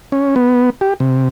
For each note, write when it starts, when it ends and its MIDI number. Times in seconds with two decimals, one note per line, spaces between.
0.12 0.35 61
0.36 0.70 59
0.81 0.94 67
1.00 1.28 48